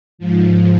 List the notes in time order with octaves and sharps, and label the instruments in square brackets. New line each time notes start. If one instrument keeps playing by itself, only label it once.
[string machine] G#2 F3